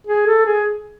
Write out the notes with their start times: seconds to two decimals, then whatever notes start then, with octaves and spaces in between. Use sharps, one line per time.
0.07 G#4
0.27 A4
0.46 G#4